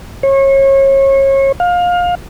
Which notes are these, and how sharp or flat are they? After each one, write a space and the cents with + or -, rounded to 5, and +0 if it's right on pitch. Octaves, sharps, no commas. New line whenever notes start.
C#5 -30
F5 +25